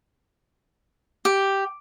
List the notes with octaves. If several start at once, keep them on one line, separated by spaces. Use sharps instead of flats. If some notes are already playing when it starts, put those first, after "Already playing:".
G4